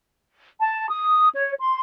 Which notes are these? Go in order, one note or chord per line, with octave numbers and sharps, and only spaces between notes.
A5
D#6
C#5
C6